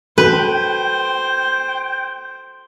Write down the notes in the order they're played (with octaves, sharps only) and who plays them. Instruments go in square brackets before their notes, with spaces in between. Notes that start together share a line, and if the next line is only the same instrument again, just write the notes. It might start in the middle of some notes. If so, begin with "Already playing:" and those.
[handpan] F#4 A4 [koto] B4 [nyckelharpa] C5 [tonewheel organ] G5